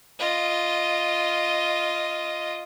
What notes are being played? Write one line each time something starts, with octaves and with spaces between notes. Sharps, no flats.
F4 D#5